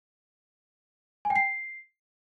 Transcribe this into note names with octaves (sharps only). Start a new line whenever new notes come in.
G#5
G5
C7